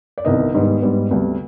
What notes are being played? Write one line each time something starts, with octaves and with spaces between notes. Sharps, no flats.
D5
C2 C3 D#3 B3 D#5
G#2 D#3 G3 B3
G#2 G3 B3
D2 C3 G3 B3